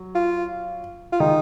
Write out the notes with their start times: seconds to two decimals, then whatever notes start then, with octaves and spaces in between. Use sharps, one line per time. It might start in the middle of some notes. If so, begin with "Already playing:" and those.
Already playing: F#3
0.15 F4
1.12 F4
1.20 D#3 G#3 D#4